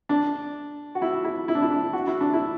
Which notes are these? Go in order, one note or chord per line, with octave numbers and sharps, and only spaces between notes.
D4
F#4
E4
E4
E4
D4
E4
D4
F#4
E4
D4
E4